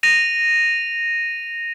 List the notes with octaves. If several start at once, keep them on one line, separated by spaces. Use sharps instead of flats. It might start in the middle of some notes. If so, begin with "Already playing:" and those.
A#6 D#7 F7